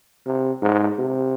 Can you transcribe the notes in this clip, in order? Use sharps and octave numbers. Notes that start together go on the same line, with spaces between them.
C3
G#2
C3